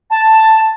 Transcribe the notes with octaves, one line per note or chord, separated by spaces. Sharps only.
A5